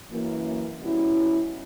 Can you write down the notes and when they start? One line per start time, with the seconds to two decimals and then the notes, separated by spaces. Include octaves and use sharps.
0.10 F#2 E3 A#3
0.82 B2 G3 C#4 E4